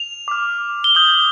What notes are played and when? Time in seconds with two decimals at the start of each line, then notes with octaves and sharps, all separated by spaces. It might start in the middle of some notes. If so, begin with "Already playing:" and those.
Already playing: F7
0.28 D6 F6
0.84 G7
0.95 D#6 G6 F#7